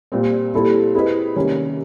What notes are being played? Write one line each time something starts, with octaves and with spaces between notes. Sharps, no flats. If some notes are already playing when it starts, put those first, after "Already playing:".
A#2 G3 C4
A#2 G3 C4 E4 A4
C4 E4 G#4 B4 D#5
C3 D#3 G3 A#3 C#4